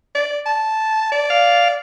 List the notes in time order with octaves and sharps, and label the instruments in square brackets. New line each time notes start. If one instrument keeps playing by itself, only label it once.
[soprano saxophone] D5
A5
D5
[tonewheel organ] F5